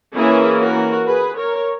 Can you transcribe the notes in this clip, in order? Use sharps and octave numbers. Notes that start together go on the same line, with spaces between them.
E3 A#3 C#4 E4 G#4
F#4 A#4
G#4 B4
A#4 C#5